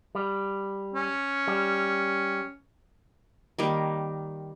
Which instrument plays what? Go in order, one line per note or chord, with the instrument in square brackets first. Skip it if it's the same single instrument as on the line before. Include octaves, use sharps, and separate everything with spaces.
[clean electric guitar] G3
[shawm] C#4
[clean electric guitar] G3
[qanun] D#3 G3 A#3